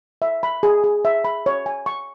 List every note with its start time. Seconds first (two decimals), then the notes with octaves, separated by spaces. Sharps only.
0.22 E5
0.43 B5
0.63 G#4
0.84 G#4
1.05 E5
1.24 B5
1.46 C#5
1.66 G#5
1.86 C#6